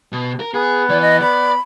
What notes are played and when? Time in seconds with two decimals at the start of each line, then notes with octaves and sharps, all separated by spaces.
0.12 B2
0.40 A#4
0.54 B3 G#4
0.89 E3 D5
1.02 D#5
1.21 D5 B5